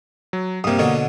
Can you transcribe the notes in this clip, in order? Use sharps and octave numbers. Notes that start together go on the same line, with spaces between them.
F#3
G2 C3 A#3 D#6
B2 D3 C#5